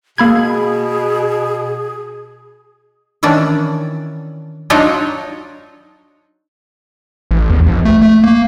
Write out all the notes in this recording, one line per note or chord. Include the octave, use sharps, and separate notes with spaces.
B2 A#3 G#4 B5 G#6
D#3 E3 C#4 D4
F#3 D4 D#4 F4 C#5 D#5
A1
E2
A#1
A3
A3
A#3